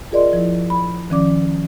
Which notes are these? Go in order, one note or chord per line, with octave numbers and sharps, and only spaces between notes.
F4 G#4 A#4 D5 D#5 C6
F3 E4
B5
D#3 F3 C#4 D5 D6